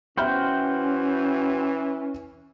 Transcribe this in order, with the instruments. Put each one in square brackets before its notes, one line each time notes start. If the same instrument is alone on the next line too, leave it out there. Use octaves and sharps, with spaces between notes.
[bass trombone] E3 [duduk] C#4 [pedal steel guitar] F#4 C5 G5 [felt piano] E5 B5 F6